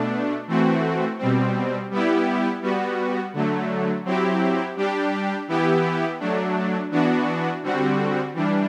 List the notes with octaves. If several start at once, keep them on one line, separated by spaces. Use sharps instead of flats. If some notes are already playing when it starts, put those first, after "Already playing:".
Already playing: B2 A3 D4
E3 A3 C4 F#4
B2 G3 C4
G3 B3 E4 G4
G3 B3 F#4
D3 F#3 A3
F#3 C4 E4 G4
G3 D4 G4
E3 B3 E4 G4
F#3 A3 D4
E3 B3 D4 F#4
D3 G3 C4 F#4
E3 G3 D4